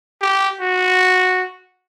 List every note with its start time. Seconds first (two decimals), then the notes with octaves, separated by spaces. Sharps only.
0.21 G4
0.61 F#4